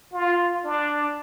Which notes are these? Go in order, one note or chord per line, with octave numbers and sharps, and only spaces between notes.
F4
D4